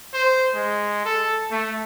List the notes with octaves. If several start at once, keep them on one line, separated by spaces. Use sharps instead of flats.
C5
G#3
A4
A3